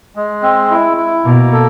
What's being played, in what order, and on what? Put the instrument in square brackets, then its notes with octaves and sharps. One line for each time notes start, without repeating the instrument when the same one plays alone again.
[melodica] G#3
C4
E4
E4
[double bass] B2 [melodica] A#3
[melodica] A4